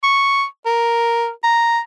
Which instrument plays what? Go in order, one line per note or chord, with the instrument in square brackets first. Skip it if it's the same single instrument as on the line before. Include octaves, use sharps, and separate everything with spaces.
[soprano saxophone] C#6
A#4
A#5